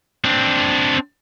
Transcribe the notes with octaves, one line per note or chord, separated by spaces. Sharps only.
C4 D4